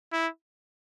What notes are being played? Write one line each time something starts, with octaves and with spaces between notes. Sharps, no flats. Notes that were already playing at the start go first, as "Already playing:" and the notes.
E4